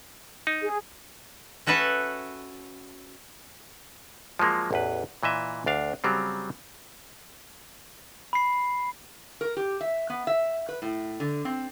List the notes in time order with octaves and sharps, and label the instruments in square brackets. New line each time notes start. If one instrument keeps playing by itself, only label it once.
[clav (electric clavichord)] D#4
[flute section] G#4
[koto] C#4 F#4 A4 B4 E5 F#5
[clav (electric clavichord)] F3 F#3 G#3 A#3
A1 E2 B4
A#2 E3 D#5 E5
D2 D4 F5
C#3 F#3 G3 C4
[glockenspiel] B5 C7
[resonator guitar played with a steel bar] A#4
G4
E5
B3
E5
B4
A2
D3
C4